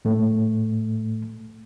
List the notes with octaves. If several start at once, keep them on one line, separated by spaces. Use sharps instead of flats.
A2 A3